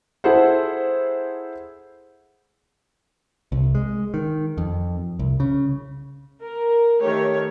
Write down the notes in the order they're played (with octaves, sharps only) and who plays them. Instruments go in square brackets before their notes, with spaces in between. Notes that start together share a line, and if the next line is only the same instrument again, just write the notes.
[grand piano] E4 G#4 A4 C5 F#5
[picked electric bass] C2
G#3
D#3
F2
C2
C#3
[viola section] A#4
D#3 A3 G4 C#5